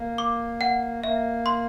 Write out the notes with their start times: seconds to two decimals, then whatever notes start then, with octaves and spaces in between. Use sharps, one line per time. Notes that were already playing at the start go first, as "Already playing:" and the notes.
Already playing: A#3
0.18 D6
0.61 F#5
1.04 A#3 E5
1.46 C6